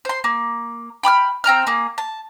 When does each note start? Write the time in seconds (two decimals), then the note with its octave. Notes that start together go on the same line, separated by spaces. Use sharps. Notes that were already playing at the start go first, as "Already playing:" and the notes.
0.05 C5 C6
0.24 A#3
1.03 G5 B5 D6 F6
1.44 C4 G5 A#5 F6
1.66 A#3 G#4
1.98 A5